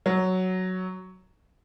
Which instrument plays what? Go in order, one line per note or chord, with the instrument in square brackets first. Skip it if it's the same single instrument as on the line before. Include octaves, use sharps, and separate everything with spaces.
[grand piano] F#3